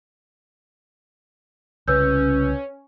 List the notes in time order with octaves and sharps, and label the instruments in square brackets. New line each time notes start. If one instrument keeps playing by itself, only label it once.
[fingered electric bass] C2 C#3 [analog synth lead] C#4 [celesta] B4 E6 G6